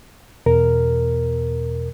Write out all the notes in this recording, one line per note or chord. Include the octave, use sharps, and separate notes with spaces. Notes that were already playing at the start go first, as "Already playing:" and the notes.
E2 B2 A#4